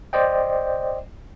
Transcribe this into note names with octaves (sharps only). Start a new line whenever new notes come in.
C5 D5 D#5 G5